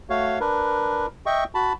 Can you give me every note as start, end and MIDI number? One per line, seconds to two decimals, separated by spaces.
0.10 0.39 57
0.10 0.39 66
0.10 0.39 73
0.10 0.39 77
0.40 1.06 62
0.40 1.06 70
0.40 1.06 71
1.26 1.44 75
1.26 1.44 76
1.26 1.44 79
1.26 1.44 85
1.55 1.73 66
1.55 1.73 81
1.55 1.73 83